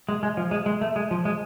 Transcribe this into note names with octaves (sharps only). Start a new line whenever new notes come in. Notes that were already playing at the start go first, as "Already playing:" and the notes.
G#3
G#3
F3
G#3
G#3
A3
G#3
F3
G#3